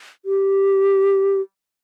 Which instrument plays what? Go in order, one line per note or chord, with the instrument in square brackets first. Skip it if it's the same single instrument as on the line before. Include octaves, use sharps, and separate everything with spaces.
[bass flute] G4